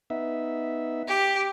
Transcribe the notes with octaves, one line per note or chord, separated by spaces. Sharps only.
B3 D#4 E5
G4